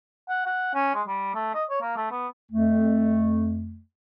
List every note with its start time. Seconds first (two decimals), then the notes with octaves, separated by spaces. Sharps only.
0.29 F#5
0.46 F#5
0.74 C#4
0.94 G#3
1.07 G3
1.35 A3
1.54 D#5
1.70 C#5
1.81 A#3
1.96 A3
2.11 B3
2.52 F2 A3